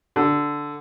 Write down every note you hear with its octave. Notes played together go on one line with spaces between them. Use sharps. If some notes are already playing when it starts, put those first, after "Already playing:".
D3